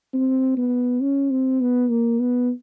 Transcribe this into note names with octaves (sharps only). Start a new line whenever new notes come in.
C4
B3
C#4
C4
B3
A#3
B3